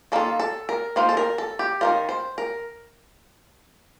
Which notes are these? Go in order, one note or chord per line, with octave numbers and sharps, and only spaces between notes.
D#3 A#3 F4 A4
A4
A#4
D#3 A#3 F4 C5
A4
A#4
A4
G4
D#3 A#3 F4 A#4
C5
A#4